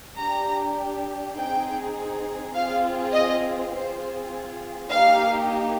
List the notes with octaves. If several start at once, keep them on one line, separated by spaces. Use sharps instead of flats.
D4 G4 A#5
C4 D#4 G#4 G5
C4 F4 G#4 F5
D#5
C4 F4 G#4 C5
A#3 D#4 G4 F5